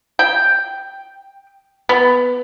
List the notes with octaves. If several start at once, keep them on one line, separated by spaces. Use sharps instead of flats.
G5
B3